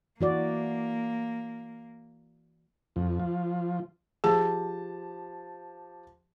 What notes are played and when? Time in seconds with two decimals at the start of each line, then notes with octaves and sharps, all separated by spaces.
0.21 E3 A#3 F#4 D5
2.96 F2
3.20 F3
4.24 F3 G4 G#4 A5